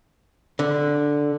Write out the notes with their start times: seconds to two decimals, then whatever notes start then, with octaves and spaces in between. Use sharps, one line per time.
0.59 D3